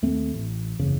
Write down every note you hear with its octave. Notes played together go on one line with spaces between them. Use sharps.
D#2 A3 C4
A1
F#1 E2 C#3